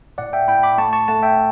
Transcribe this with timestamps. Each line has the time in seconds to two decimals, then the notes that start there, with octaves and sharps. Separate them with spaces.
0.18 A2 D5 F#5
0.33 E5 G5
0.48 A2 G5 B5
0.63 B5 D6
0.78 A3 A5 C#6
0.93 A5 C#6
1.08 A3 F#5 A5
1.23 E5 G5